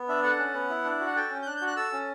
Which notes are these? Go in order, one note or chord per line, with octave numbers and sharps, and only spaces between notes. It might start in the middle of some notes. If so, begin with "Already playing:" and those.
Already playing: B3
D4 E5
A4 F#5
C#4
B3
E4
D4
F#4
F#5
A4 G5
C#4
G6
D4 F#6
G6
F#4
F#6
A4 E6
C#4